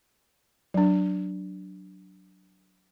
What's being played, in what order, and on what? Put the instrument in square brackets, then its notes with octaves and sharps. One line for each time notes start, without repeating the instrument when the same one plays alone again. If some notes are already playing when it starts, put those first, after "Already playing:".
[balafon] F#3 D4